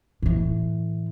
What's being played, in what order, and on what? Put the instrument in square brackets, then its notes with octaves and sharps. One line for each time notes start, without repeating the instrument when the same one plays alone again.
[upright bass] A2 E3